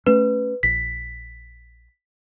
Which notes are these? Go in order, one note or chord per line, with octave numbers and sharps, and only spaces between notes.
A3 C#4 B4
A#1 B6